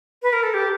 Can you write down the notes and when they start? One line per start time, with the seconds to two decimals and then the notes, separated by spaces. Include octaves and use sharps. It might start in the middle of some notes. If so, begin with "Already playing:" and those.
0.22 B4
0.32 A#4
0.43 A4
0.53 G4